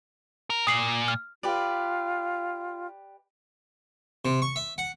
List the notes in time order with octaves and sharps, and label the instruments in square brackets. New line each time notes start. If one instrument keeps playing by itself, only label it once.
[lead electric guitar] A#4
[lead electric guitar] A#2 [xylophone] D#6 C7 F#7
[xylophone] F6
[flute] F4 [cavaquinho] G4 B4 D5
[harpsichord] C3
C#6
E5
F#5